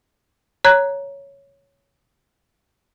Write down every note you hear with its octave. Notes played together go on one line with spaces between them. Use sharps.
C#5 A#5 F#6 G#6